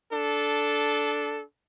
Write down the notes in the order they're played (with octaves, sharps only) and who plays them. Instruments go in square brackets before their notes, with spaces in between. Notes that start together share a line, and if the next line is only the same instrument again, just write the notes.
[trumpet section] D4 A4